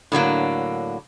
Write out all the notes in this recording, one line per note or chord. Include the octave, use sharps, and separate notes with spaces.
A2 D3 F#3 A#3